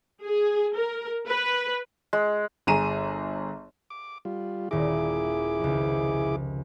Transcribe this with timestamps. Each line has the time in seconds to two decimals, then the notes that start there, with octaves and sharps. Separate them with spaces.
0.24 G#4
0.75 A#4
1.27 B4
2.13 G#3
2.67 G1 G#4 A#5 D#7 E7
3.90 D6
4.25 G3 F4
4.71 D#1 E4 G#4 A#4 D6
5.60 F1 C#2